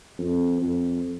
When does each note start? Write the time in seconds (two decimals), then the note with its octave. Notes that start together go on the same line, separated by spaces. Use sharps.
0.19 F2
0.61 F2